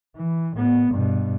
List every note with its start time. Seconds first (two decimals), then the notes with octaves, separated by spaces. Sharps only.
0.16 E3
0.57 A2 B3
0.92 G2 B2